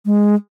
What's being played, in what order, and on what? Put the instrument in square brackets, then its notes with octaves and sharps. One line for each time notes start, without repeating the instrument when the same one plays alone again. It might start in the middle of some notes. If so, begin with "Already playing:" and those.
[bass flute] G#3